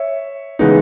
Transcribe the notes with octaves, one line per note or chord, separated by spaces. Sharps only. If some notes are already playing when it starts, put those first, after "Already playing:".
Already playing: C#5 E5
C#3 E3 G#3 B3 D#4